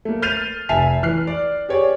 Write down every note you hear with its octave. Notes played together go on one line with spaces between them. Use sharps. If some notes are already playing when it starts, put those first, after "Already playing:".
A3 A#3
F6 G6 A6 C7 D#7 F7
F1 E5 G#5 A5 C7 F7
E3 F6 F#6 C7
D5
G4 G#4 C#5 D5